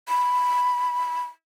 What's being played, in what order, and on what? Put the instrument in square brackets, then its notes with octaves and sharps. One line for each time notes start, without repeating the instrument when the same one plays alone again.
[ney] B5